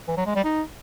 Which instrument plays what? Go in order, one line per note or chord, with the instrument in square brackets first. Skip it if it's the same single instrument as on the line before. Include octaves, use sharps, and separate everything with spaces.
[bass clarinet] E3
F#3
G#3
G3
D#4